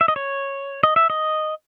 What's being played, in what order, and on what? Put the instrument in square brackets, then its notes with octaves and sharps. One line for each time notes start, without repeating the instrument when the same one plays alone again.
[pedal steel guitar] E5
D#5
C#5
D#5
E5
D#5